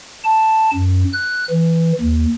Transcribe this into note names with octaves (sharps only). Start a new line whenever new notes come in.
A5
F#2
F#6
E3
D#2